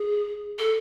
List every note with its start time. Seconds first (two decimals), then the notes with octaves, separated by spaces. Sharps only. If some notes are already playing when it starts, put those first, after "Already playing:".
Already playing: G#4
0.58 A4